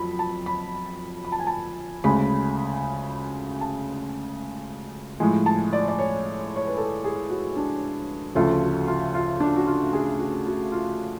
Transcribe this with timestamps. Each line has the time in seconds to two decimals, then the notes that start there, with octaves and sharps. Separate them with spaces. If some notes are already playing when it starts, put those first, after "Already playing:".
Already playing: F2 F#3 B5
0.19 A5
0.46 B5
1.25 B5
1.32 A5
1.40 G#5
1.47 A5
2.04 D2 C#3 G#3 B5
3.61 A5
5.20 A2 F3 G#3
5.46 A5
5.73 D5
5.88 D5
5.99 C#5
6.56 C#5
6.67 B4
6.77 A4
7.04 G#4
7.29 F#4
7.57 D4
8.35 D2 C#3 F3 A3 F4
8.62 F#4
8.87 F4
9.14 F4
9.40 D4
9.56 F#4
9.67 F4
9.93 G#4
10.19 F#4
10.46 F#4
10.72 F4